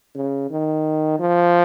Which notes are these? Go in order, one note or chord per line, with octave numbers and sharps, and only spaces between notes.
C#3
D#3
F3